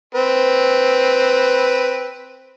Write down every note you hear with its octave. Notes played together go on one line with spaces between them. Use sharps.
C4 B4